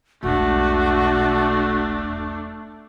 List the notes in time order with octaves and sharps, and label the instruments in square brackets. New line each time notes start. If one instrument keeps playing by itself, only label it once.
[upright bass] E1 B1 [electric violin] A3 D4 [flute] F#4